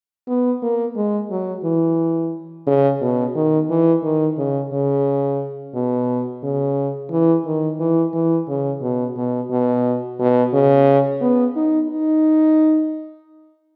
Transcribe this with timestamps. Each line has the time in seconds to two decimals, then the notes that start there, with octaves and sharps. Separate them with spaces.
0.28 B3
0.62 A#3
0.96 G#3
1.31 F#3
1.64 E3
2.67 C#3
3.01 B2
3.35 D#3
3.70 E3
4.03 D#3
4.38 C#3
4.72 C#3
5.75 B2
6.43 C#3
7.11 E3
7.46 D#3
7.80 E3
8.14 E3
8.48 C#3
8.82 B2
9.17 B2
9.51 B2
10.19 B2
10.53 C#3
11.21 B3
11.56 D#4
11.90 D#4